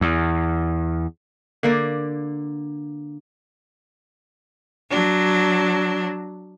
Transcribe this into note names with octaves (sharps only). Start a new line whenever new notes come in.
E2
D3 A#3 D5
F#3 D4